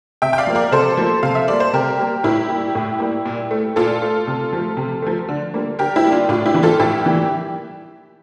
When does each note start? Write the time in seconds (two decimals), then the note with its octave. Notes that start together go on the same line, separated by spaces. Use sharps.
0.22 C3 E5 G5
0.33 G5
0.38 D5 F5
0.47 F3 A#3
0.55 A#4 D5
0.72 C3 A4 C5
0.97 F3 A#3
1.23 C3 F5
1.35 E5
1.48 G3 A#3 D5
1.60 C5
1.73 C3 G4 A#4
1.98 G3 A#3
2.24 A2 E4 G4
2.49 A#3
2.54 G3
2.75 A2
3.00 G3 A#3
3.25 A#2
3.51 A3
3.76 A#2 F4 A4
4.02 A3
4.27 C3
4.53 F3 A3
4.77 C3
5.02 F3 A3
5.29 D3
5.54 G3 A#3
5.79 D3 G4 A#4
5.96 E4 G4
6.04 G3 A#3
6.12 D4 F4
6.29 A2 D4 F4
6.46 E4 G4
6.54 E3 G3 A#3
6.63 F4 A4
6.79 A2 E4 G4
7.06 E3 G3 A#3